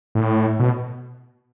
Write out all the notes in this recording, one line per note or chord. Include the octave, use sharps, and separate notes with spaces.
A2
B2